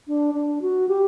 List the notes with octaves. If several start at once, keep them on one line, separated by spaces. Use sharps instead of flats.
D4
D4
F#4
G4